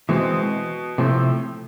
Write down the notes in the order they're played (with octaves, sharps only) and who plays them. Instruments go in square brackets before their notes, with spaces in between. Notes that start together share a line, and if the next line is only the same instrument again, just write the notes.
[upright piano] B2 [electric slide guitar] E3 G#3 C4
[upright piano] A2 [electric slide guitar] C3 F3 A3 C4